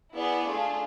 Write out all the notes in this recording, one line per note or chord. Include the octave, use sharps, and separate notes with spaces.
B3 E4 G#4 B4 D5
A3 D4 F4 G#4